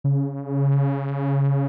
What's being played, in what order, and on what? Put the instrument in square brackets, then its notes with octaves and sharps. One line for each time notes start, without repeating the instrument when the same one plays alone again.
[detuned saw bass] C#3